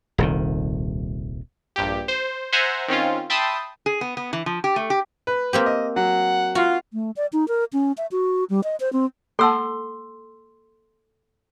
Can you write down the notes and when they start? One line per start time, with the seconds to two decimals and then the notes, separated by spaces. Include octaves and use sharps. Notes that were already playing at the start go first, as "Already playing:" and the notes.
0.18 D#1 C2 D#3
1.76 A#1 G2 G4
2.08 C5
2.53 C5 E5 F#5 G#5 A#5
2.88 D#3 C4 C#4 F4
3.30 E5 G5 A5 B5 C6 D#6
3.86 G#4
4.01 B3
4.17 B3
4.33 E3
4.46 F3
4.64 G4
4.76 A3
4.90 G4
5.27 B4
5.53 A#3 C4 G4
5.66 D#5
5.96 F#3 F#5
6.55 F4 F#4
6.93 A3
7.16 D5
7.33 D#4
7.48 A#4
7.73 C#4
7.98 E5
8.12 F#4
8.50 G3
8.64 D#5
8.80 C5
8.93 C4
9.39 A#3 A4 F#5 A5 C6 E6